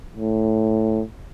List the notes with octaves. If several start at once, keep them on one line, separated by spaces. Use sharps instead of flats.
A2